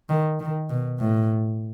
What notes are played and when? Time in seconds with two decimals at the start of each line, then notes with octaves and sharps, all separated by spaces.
0.09 D#3
0.40 D#3
0.70 B2
1.00 A2